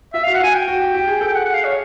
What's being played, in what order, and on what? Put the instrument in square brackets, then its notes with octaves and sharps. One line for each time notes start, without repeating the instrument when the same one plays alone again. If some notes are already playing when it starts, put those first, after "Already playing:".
[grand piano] F4 [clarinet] E5
[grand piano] F#4 [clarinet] F5
[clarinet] F#5
[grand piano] F4 [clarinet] G#5
[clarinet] G5
[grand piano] F#4
G4
G4
G#4
A4
[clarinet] G5
F#5
F#5
F5
C#5